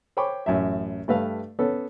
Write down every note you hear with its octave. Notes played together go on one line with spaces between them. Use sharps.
C5 C#5 G5 B5 C#6 D6
A1 F#2 A2 E5
G2 A3 B4 F5
B3 C#4 A4